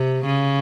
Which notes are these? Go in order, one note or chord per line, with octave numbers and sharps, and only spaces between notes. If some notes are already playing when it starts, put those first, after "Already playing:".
Already playing: C3
C#3